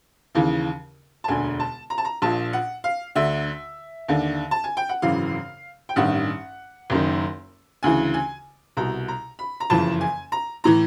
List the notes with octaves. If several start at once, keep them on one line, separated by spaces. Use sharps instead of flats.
D#2 C#3 E3
A5
E1 D2 D3 G#5
A5
A#5
A5
A#5
A#1 A#2 A5
F#5
F5
D2 D3 E5
D#2 D3
A5
G#5
G5
F#5
G#1 F#2 C#3 E3 F5
G5
A1 G2 D#3 F#5
F#1 F#2 D#3
D2 C#3 E3 G#5
G#5
C2 B2 A#5
A#5
B5
A#5
F#1 F2 C#3 E3 A5
G#5
A#5
A2 E3 A#5